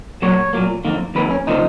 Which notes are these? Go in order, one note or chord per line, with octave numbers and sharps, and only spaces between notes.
A#2 F#3 A#3 C#5
A#2 F#3 A#3
F2 D#3 A#3
F2 D#3 A#3 B4
C#4
C#3 F3 A#3 D#4